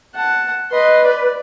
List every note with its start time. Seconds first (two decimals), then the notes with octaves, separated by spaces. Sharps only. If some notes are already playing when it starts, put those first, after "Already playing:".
0.15 F#5 A5
0.71 B4 D#5 C6
1.04 D5